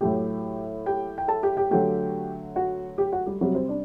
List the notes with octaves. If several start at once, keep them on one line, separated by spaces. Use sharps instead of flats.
A2 F#3 A3 G4 G5
G4 G5
G5
A4 A5
G4 G5
G4 G5
D3 F#3 A3 G4 G5
F#4 F#5
G4 G5
F#4 F#5
G3 G4
C3 F#3 G3 F#4
C4 C5
D4 D5